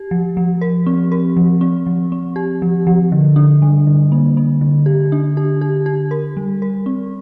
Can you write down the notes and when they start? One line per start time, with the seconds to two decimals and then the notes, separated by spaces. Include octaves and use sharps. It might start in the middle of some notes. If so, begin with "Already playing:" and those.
Already playing: G4
0.11 F3
0.37 F3
0.61 A#4
0.86 C4
1.12 A#4
1.37 F3
1.61 C4
1.87 F3
2.12 C4
2.36 G4
2.62 F3
2.87 F3
3.12 D3
3.36 D4
3.62 G3
3.87 D3
4.12 A#3
4.37 A#3
4.61 D3
4.86 G4
5.12 D4
5.37 G4
5.61 G4
5.86 G4
6.11 A#4
6.37 G3
6.62 A#4
6.86 C4